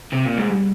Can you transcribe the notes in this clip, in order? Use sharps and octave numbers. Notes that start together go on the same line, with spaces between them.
C3
A#2
G#2
G3